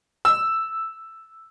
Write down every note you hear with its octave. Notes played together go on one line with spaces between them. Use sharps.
E6